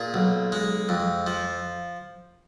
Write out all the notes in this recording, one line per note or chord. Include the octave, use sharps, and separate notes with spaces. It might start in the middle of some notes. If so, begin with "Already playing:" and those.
Already playing: A#2 G#4
B1
G#3
F2
F3